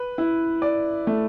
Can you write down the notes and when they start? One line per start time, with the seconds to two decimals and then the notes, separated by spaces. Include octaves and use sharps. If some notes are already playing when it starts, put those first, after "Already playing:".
Already playing: B4
0.18 E4
0.62 D5
1.07 A3